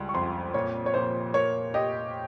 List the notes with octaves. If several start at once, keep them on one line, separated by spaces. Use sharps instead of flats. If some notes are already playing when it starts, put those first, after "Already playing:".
Already playing: C#2 G3 G#5
C#6
F2 C6
A#2 C#5
C#5
A#2 C5
A#4 C#5
G4 D#5